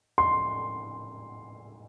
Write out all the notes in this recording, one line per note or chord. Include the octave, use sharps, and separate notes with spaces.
C6